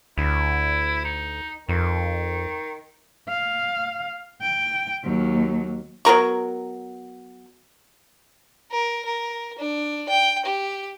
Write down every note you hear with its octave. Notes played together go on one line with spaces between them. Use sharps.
D2 E4
D#4
F2 D#3
F5
G5
D#2 F#3
F#3 B3 A#4 C#6
A#4
A#4
D4
G5
G4